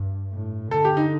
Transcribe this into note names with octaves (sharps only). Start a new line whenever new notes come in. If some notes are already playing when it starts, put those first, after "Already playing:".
Already playing: G2
A2
D3 A4
G4
D#4